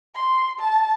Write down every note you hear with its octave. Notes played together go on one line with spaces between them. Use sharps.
C6
A5